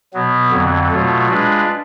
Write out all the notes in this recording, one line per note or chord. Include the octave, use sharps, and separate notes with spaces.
B2 F#3 B3
F2 D3 F#3
B2 F#3 A3 F4
G#3 D4 F4 B4